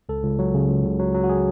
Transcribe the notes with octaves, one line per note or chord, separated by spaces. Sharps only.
C#2 A4
C#2
F#3
C#3
C#2
C#2
F#3
F#3
F#4
G#4